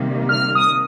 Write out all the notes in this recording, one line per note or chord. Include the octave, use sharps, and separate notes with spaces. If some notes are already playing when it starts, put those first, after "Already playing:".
Already playing: C3 D#3 G3 A#3
F6
D#6